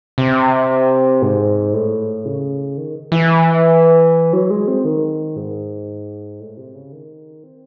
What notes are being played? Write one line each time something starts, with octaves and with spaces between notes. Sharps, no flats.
C3
G#2
A2
C#3
D#3
E3
F#3
G#3
C4
D#3
G#2
A2
C3
C#3
D#3
C4